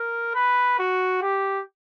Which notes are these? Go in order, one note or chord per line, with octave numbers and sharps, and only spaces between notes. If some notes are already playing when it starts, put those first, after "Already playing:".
Already playing: A#4
B4
F#4
G4